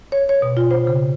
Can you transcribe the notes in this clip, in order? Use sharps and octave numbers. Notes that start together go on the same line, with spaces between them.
C#5
C#5
B2
F4
C5
C#3